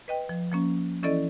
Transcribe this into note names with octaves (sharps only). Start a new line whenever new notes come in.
B4 D#5 G5
F3
F3 A#3 C#4
E3 C#4 E4 A4 D5 D#5